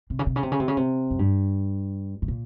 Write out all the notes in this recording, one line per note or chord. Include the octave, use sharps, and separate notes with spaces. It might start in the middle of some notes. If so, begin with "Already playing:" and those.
C3
C#3
C3
C#3
C3
C#3
C3
C#3
C3
F#2
G2
A2
A#2